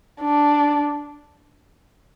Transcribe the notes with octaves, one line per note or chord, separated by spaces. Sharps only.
D4